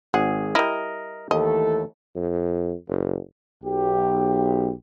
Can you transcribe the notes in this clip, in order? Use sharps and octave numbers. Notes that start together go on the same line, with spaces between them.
G#1 G#4 F#5
G3 E4 A#4 D#5
D#2 E3 A3 A4 D#5
F2
F#1
B1 G4